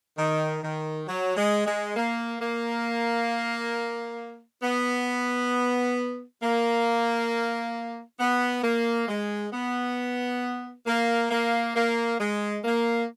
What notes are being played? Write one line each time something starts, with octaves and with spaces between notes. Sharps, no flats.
D#3
D#3
F#3
G#3
G#3
A#3
A#3
B3
A#3
B3
A#3
G#3
B3
A#3
A#3
A#3
G#3
A#3